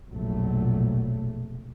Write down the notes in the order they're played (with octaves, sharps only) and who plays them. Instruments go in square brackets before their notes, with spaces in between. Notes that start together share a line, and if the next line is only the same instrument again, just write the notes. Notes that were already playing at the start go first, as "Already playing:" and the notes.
[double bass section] F1 A#1 B2 F#3 A3